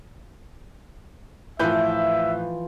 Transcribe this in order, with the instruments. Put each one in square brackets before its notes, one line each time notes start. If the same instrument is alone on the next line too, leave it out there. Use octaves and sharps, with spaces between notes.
[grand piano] A2 B4 G6 [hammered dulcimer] E3 F3 [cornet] E5